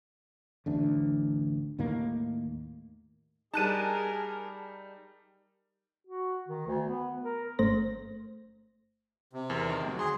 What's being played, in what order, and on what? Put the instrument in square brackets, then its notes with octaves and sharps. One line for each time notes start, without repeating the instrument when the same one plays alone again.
[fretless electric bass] A1 D2 D4
D#2 A2 D#3 A#3
[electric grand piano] G3 D#4 [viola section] G#4 A#4 [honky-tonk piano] A5 F#6 D#7
[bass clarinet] F#4
D#3
D2
B3
A#4
[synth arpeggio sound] G1 A3 C5 A#6
[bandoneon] C3
[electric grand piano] E2 [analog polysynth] A#4
[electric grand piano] D#3
[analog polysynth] D2 F#3
[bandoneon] G#4 [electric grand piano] C6